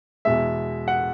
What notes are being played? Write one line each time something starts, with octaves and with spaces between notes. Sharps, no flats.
E2 B2 G#3 E5
F#5